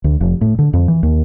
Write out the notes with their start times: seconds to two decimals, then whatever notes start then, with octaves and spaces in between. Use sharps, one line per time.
0.04 D2
0.21 F1
0.41 A2
0.59 D3
0.73 F2
0.88 E3
1.03 D#2